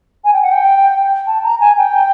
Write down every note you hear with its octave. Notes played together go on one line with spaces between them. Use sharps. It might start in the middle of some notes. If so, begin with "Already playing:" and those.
G#5
G5
F#5
G5
A5
A#5
G#5
G5